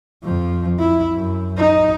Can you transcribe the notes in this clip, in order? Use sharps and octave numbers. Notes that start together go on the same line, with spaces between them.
F2 F3
E4
F#2
D#4